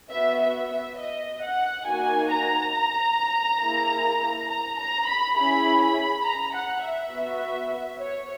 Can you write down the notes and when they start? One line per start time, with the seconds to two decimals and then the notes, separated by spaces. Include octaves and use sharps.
0.11 B3 F#4 E5
0.40 E5
0.69 E5
0.98 D#5
1.42 F#5
1.86 A#3 D#4 F#4 G#5
2.30 A#5
3.61 A#3 E4 G#4
4.49 A#5
4.78 A#5
5.07 B5
5.36 C#4 E4 G#4 B5
5.80 B5
6.24 A#5
6.54 F#5
6.83 E5
7.11 B3 F#4
7.99 C#5